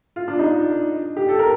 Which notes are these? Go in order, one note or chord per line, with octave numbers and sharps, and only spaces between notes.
F4
D4
D#4
G4
A4
A#4